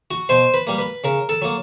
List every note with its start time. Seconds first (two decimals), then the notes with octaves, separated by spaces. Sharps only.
0.11 F#4
0.29 B2 C5
0.54 B4
0.67 G3 A#3
0.79 B4
1.04 C#3 A#4
1.29 A4
1.42 F#3 A#3